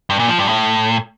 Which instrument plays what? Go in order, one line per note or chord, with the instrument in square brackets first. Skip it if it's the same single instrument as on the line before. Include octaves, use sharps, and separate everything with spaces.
[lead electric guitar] G2
A#2
F3
G2
A2